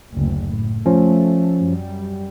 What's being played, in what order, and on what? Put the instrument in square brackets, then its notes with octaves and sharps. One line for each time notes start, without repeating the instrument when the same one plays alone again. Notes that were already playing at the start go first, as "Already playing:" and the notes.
[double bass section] F#1 D2
A2
[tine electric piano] F3 C#4 [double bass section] A3
[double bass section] F#2 G3